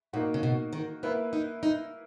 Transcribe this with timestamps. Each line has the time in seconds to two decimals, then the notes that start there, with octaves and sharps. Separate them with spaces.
0.13 A#2 A#3 D#4 F#4
0.34 C#3
0.43 B2
0.73 D#3
1.03 A#3 B3 E4 B4
1.33 D#4
1.63 D#4